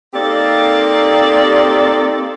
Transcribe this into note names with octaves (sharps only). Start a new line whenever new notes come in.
A#3 C4 D#4 G4 A4 D5